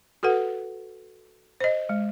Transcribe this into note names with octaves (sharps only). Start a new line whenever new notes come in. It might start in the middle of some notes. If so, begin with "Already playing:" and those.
F#4 A4 B4 F#5
C5 D#5
G#3